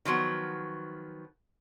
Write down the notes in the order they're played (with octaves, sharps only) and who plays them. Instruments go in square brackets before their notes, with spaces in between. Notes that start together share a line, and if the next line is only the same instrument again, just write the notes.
[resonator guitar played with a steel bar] D#3 F3 F#3 B3